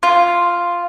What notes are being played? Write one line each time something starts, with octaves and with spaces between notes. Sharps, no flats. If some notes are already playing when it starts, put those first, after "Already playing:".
F4